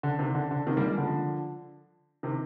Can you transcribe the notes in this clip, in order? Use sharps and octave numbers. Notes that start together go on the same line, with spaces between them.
D3
C3 D#3
D3
D3
C3 D#3
G3 A#3
F3 G#3
D3 F3
C3 D#3